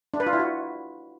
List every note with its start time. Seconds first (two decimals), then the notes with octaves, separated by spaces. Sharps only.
0.14 D4
0.20 B4
0.27 F4
0.33 E4
0.39 F#4